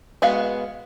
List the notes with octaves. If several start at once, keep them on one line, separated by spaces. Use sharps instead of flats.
G#3 B3 F#4 F5